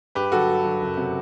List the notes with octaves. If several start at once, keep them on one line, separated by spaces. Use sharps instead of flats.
G2 G4 B4
D3 F#3 F#4 A4
G2
D3 F#3
F#1
C3 F#3